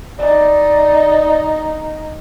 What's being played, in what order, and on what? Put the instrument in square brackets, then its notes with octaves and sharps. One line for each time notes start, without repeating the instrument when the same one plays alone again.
[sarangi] D#4 [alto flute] D5